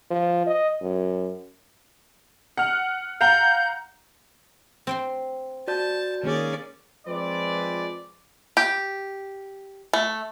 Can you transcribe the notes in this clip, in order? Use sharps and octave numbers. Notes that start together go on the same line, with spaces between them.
F3
D#5
F#2
F#5 F6
F5 F#5 A#5 G6
C4 G5 C6
F#4 D5 A5 G6
D#3 A#3 C#4 G#4 D5
F3 G#3 C4 B4 D5
G4
A3